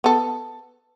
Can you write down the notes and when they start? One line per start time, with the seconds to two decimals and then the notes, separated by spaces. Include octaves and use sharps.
0.04 B3 A4